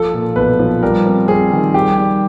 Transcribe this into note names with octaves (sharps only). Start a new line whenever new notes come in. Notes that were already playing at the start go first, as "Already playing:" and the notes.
Already playing: F3 A4
A#2
B1 B4
F3
G3 A#4
C4
C4 G#4
D#3
G3 G4
G3